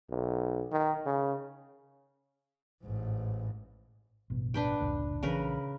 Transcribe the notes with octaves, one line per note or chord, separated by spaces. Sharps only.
B1
D#3
C#3
A1 G#2
A1 G2 B2
D4 B4 G5
F1 C#2 A2
A#1 C#3 E3 A#4 B4